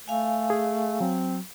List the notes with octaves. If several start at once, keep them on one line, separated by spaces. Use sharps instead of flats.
A3 F5 G#5
G#4
F#3 C4